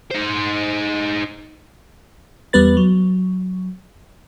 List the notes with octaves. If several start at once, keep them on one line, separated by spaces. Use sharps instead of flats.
D#4 C5
E2 G3 B3 B4 A6
F#3